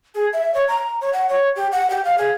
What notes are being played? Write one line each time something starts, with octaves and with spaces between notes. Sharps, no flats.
G#4
E5
C#5
A#5
C#5
F#5
C#5
G4
F#5
G4
F5
G#4